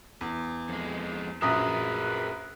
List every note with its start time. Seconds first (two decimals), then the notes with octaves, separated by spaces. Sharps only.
0.21 E2
0.69 F2 G#3
1.42 A#1 F#2 G#4 A#4 B4 E5 A#5 D#6